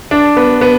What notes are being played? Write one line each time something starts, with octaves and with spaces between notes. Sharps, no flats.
D4
B3
B3